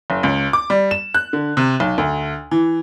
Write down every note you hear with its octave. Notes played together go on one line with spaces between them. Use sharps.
F#1
C#2
D6
G3
E7
F#6
D3
C3
B1
D2
E3